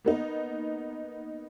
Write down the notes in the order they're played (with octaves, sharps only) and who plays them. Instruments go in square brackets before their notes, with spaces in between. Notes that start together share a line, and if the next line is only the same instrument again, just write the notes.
[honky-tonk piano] A#3 B3 D#4